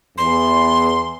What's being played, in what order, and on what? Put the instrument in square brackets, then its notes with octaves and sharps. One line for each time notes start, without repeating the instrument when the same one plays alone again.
[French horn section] E2 [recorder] C6